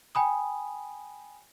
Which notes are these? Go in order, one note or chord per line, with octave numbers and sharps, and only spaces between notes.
G5 G#5 B5 D#6